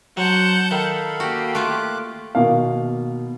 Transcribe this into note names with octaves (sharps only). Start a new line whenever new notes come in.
F#3 C5 F#5 A5 G6
D#3 A4 F5 B5
A#3 F#4 G4
A3 F4 D6 F#6
B2 D#3 A#3 F5